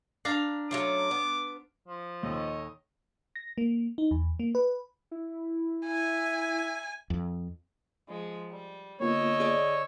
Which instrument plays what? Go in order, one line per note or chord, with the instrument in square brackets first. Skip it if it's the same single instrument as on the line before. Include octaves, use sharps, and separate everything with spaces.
[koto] D4 F5 A#5
[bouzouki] F#3 A3 C#4 [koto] F4 [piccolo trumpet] D6
[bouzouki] B3
[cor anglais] F3
[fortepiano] D#2 A#2 [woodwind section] A4 C#5 D#5
[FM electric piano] A#6
A#3
D#4
E2
A#3
B4
[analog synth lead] E4
[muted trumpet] E5 [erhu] G#5
[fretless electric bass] F2
[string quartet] F3 G#3
G3
[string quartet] D3 D#5 E6 [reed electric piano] A#3 B3 F4 [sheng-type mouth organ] C#5
[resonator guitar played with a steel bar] G#4 D5